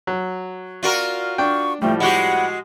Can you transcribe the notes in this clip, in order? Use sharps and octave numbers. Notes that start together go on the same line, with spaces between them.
F#3
F4 F#4 A#4 D5
D4 G5 C#6
A2 F3 G3 A3 G5
G#3 F#4 G4 F#5 B5